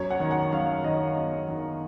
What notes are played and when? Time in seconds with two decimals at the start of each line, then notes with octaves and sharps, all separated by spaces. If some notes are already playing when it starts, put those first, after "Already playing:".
Already playing: F#2 C#5
0.10 F#5
0.20 D#3
0.31 F#5
0.52 F#2 F5
0.84 D#3 D#5
1.16 F#2
1.49 D#3